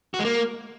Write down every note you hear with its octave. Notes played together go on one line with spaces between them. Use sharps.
F#4
G#3
A#3